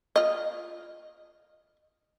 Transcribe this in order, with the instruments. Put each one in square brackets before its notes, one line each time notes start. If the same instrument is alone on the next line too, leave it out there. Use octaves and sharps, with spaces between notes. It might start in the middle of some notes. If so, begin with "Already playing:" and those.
[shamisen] F4 D#5